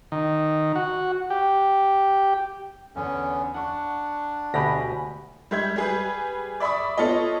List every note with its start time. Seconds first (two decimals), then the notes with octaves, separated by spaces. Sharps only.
0.12 D#3
0.76 F#4
1.30 G4
2.96 E2 D3 B3 C#4
3.54 D4 F#5 C#6
4.54 D2 B2 G4 G#5 B5 A#6
5.51 G3 G#3 E5 G6 G#6
5.76 G3 G#4 B4
6.60 D5 E5 B5 C#6 D#6
6.98 B3 F4 A4 C#5 D#5